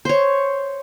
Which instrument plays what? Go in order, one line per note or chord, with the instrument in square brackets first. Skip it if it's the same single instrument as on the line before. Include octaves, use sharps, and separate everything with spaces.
[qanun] C5 C#5